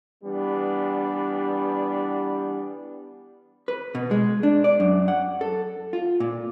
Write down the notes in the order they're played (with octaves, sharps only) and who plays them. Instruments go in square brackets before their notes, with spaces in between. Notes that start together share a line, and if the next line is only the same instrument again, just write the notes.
[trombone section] E3 G3 B3 D4
[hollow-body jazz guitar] B4
B2
G#3
D4
D5
F#2
F#5
A4
F4
A#2